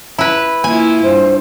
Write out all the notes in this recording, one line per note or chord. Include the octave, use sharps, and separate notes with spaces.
E4 B4
A#3 E4 F4 G#5
G2 C5